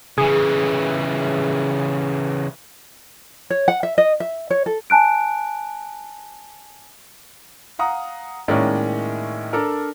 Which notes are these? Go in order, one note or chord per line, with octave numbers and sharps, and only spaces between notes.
C#3 E3 G#4
C#5
F#5
E5
D#5
E5
C#5
A4
G#5 A5 F#6 D7
F5 F#5 A#5 D#6
A2 D#3 G#3 A#3 C#4 D5
D4 A4 A#4